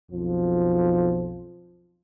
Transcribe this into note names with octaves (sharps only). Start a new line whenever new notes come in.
B1 F2 F3